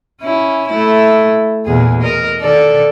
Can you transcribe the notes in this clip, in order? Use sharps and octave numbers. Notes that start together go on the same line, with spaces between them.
C#4 E4
A3 E4
E2 A#2 G#4
A#4 D#5
D#3 A4 D5